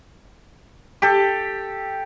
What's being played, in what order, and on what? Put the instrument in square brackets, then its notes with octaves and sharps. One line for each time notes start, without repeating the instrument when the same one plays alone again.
[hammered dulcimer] G4 A4